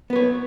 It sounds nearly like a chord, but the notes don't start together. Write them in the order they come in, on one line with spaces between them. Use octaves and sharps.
B3 B4 C#5